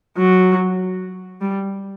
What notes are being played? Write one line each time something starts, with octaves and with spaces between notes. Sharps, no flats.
F#3
G3